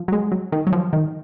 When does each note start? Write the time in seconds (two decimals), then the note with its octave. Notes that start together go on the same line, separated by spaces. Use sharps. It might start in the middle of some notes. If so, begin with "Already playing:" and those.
Already playing: F3
0.08 F#3
0.12 G#3
0.32 F#3
0.52 D#3
0.67 F#3
0.73 F3
0.93 D#3